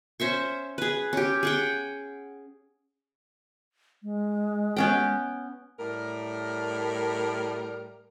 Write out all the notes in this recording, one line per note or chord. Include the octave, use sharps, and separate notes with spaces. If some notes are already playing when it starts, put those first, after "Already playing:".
C#4 C5 E5 C#6
G#4 B4
C#4 G4
G#4 F#5 G5
G#3
B3 C#4 G5
A2 G3 A#4